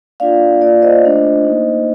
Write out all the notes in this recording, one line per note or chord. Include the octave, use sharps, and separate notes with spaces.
A#3 D4 F4 D5 F5
A#3 F4 D5 F5
C5 D#5
A3 D4 F4
A#3 D#4